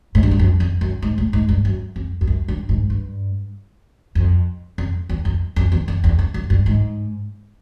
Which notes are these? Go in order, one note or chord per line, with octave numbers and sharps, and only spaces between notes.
G#2
G2
F#2
F2
F2
F#2
G#2
A2
G#2
G2
F#2
F2
F2
F#2
G2
G#2
G2
F2
F2
E2
F2
F2
E2
F2
E2
F2
F#2
G2
G#2